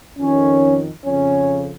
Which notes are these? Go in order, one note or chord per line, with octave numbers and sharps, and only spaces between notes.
F2 D#3 C#4
F2 C#3 C#4